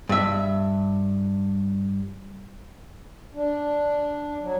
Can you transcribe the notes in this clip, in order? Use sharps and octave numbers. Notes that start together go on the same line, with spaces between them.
G2 E5
D4
F#3